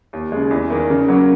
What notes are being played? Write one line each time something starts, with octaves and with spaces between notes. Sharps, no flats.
D#2
C#3 G#3
E2
D#3 A#3
C#3
F#3 A#3 C#4